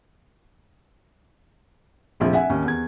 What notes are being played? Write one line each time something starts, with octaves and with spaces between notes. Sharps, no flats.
F1 A#1 F3
E5 F#5 G#5
D#2 C#4
E2 G#6